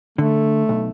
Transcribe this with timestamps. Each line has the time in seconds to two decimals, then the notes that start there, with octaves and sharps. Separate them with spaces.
0.18 D3 A3
0.69 B1